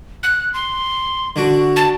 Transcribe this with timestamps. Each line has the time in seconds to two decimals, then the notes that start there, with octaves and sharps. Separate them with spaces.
0.23 F#6
0.54 C6
1.36 D3 D4 F#4
1.76 A5